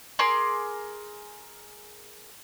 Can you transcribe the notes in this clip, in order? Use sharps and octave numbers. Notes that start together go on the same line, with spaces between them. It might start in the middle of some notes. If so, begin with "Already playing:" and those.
G#4 A#4 C6 D6